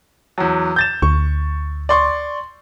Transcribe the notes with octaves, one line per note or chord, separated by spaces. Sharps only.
E2 F#3
G6 A6 E7
D2 C#6
D5 C6 C#6